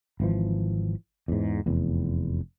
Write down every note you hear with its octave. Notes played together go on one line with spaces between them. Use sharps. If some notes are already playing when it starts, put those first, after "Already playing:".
G#1 E3 F3
E2 G#2
F1 E2